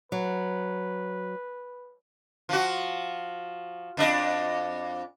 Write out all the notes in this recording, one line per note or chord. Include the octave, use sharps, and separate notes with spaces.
F#3 B4
F3 F#4
F2 D4 D#5